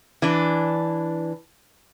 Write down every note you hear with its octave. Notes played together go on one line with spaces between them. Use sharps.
E3 D4